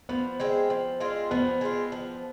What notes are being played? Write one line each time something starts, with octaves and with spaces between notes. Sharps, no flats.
F3 B3
G#3 C4 F4
F3
G#3 C4 F4
F3 B3
G#3 C4 F4
F3